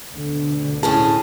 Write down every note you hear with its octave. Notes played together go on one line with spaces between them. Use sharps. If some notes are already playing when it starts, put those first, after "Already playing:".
D2 B2 D3
A2 C#4 G#4 A5